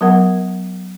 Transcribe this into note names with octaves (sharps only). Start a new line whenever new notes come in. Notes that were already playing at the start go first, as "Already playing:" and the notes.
F#3 B3 A#4 F#5